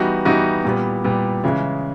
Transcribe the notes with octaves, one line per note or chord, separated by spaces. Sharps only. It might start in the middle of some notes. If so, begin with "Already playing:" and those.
Already playing: E3 G3 B3 D#4 F#4
E3 G3 B3 D#4 F#4
A#2 G3 B3
A#2 G3 B3
C#3 E3 G#3